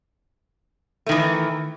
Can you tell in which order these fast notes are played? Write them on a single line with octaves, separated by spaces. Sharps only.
A3 D#3 E3